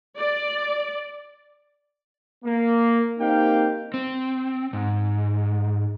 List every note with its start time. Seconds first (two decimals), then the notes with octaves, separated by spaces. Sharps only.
0.18 D5
2.44 A#3
3.20 A#3 C4 D#4 G4 F5 G5
3.94 C4
4.73 G#2